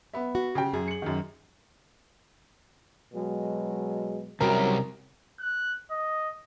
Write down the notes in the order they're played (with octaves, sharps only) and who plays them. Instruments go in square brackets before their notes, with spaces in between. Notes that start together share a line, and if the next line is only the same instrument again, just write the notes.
[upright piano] B3 E5
[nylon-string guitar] F#4
[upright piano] C#3 G4 G5
[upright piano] F#2 [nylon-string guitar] G#4
[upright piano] C#7 F#7
F#2 D#3
[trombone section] B2 F#3 G#3
[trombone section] G#1 F#2 F#3 [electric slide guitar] C3 G3 [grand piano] A#4
[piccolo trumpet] F#6
D#5